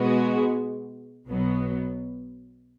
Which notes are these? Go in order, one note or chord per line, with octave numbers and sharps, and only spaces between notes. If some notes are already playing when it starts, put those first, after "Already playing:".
Already playing: B2 G#3 B3 F#4
B1 B2 F#3 B3